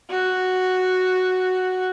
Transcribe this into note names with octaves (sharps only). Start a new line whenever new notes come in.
F#4